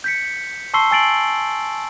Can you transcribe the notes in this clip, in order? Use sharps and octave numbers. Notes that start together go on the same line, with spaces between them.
G6 B6 C#7
A5 C6 C#6 E6 C7 G7
G#5 E6 A6 C7 D7 F#7